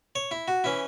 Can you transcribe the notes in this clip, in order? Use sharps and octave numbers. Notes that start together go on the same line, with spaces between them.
C#5
E4
F#4
E3 C#4 E4